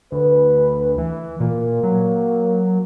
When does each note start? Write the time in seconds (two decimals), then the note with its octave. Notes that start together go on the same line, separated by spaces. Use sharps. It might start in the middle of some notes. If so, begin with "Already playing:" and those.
0.12 D2 B4
0.98 E3
1.40 A#2 A#3
1.83 F#3